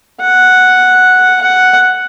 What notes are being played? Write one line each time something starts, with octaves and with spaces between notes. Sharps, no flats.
F#5
F#5